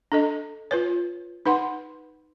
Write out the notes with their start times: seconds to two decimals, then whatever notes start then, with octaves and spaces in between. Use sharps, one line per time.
0.12 D4 A4 D#5
0.71 F4 B4 C#5
1.46 D#4 B4 F#5 C6